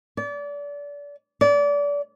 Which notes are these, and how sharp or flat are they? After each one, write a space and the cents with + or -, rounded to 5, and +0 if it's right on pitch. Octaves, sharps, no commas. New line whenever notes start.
D5 -30
D5 -30